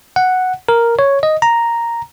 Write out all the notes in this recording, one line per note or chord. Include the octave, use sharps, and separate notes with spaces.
F#5
A#4
C#5
D#5
A#5